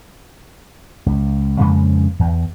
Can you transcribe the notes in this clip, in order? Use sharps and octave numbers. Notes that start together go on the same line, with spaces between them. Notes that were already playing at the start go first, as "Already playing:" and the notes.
C#2
F2 C#3 G#3 A#3
E2